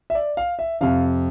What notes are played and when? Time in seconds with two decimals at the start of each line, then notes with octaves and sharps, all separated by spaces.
0.10 E5
0.15 D5
0.37 F5
0.59 E5
0.81 F2 C3 F3 F5